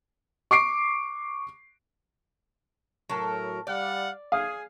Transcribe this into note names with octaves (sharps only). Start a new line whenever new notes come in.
C#6 D6 C7 D7
A2 F#3 A4 A#4
G3 D5 F5 F#5
G#4 F5 D#6